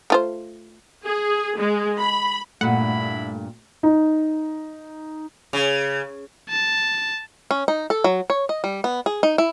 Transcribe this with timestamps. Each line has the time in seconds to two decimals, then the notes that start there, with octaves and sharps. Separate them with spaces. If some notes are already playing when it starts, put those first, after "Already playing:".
0.10 A3 F4 C5
1.05 G#4
1.58 G#3
1.99 B5
2.61 G2 A#2 A3 D4 E4 F#5 B5
3.83 D#4
5.53 C#3
6.50 A5
7.51 C#4
7.68 D#4
7.90 A4
8.04 F#3
8.30 C#5
8.49 D#5
8.64 G3
8.84 B3
9.06 G#4
9.23 D#4
9.38 E4